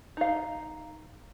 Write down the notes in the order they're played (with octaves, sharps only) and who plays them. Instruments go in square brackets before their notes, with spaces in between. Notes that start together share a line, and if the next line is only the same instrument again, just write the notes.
[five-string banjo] D#4 F5